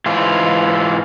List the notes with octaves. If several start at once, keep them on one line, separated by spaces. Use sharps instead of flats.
G#2 E3 F4